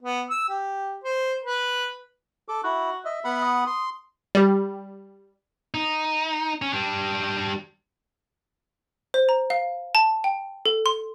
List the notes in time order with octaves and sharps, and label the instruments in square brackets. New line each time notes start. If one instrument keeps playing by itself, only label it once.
[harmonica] B3
E6
G4
C5
B4
[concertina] A4 D6
[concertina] E4 [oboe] F#4
[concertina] D#5 [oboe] E5
[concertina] B3 F#5 B5
[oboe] D#6
[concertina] C6
[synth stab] G3 G4
[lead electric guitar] D#4
C#4
G3 D4
[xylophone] C5
A#5
F5
A5
G5
A4
C6